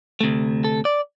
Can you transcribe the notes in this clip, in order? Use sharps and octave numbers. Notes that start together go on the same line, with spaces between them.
D2 C3 A3
A4
D5